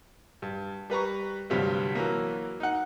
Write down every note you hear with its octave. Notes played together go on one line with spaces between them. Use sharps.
G2
G3 B4 A#5 C#6
D2 G2 C3 F3 F#3
E3 F#3 A#3
D#4 F#5